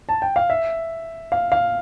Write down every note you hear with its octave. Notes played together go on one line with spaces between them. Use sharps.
A5
G5
F5
E5
F5
F5